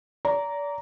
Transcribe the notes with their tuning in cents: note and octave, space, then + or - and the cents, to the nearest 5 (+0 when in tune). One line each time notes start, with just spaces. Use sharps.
D5 -30 A#5 +0